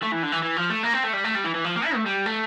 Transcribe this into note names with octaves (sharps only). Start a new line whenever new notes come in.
A3
E3
D3
E3
E3
F3
A3
A#3
C4
A3
G3
A3
G3
E3
E3
F3
A#3
E4
A3
G3
A3